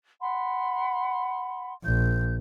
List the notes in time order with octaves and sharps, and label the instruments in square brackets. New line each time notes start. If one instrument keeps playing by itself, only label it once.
[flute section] F#5 B5 C6
[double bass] A#1 [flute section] G6